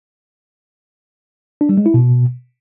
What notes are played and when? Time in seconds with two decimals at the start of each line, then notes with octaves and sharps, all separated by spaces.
1.61 D4
1.69 G3
1.77 G#3
1.86 E4
1.94 B2